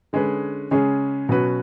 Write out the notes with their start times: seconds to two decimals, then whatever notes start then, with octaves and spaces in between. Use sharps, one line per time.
0.13 D3 G#3 C#4 G#4 B4
0.71 C#3 G#3 C#4 G#4
1.29 B2 F#3 C#4 F#4 B4